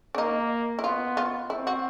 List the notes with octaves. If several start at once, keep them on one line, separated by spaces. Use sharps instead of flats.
D4
A#3 D#4
E4
B3 F4
F4
C4 E4
F#4